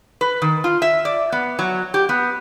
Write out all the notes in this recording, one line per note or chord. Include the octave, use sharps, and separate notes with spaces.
B4
D#3
F4
E5
D5
B3
F#3
G4
B3